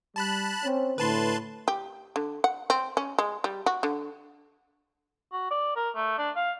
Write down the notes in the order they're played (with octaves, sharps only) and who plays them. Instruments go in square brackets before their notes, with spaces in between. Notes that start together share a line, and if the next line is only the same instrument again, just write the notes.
[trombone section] G3 [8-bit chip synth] A5 B5 F#6
[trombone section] C4 C#4
[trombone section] A2 D3 [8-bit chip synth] B4 A5 C6
[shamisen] G4
D3
F#5
C4
C#4
G#3
G3
F#4
D3
[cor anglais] F#4
D5
A#4
A3
D4
F5